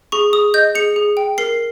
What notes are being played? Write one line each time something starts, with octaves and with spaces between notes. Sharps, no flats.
G#4 C#6
G#4 D#6
D#5 G6
G#4 C#7
G#4
G5
A#4 C7